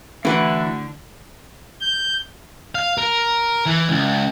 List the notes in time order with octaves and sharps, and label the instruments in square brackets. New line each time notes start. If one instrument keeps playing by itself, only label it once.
[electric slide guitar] D3 [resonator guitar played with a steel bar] E3 B4 [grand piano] A3 E4 F#4 [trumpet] E5
[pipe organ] G6
[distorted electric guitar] F5
A#4
E3
C#2